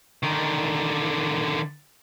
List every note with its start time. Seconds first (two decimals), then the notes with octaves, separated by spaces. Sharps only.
0.23 D3 D#3